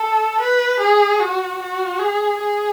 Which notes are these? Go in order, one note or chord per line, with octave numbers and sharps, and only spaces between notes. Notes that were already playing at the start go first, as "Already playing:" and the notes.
Already playing: A4
B4
G#4
F#4
F#4
G#4
G#4